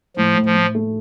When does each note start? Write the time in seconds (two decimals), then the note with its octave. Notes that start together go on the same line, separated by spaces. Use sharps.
0.17 A2 F3
0.36 A2
0.46 F3
0.56 A2
0.75 A3